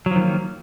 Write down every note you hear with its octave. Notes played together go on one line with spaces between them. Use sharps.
D#3 F3 F#3 A#3